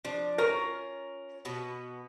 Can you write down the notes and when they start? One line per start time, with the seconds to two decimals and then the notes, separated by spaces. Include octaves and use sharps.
0.04 F3 D4
0.38 C#4 F4 A#4 A#5
1.45 B2 B3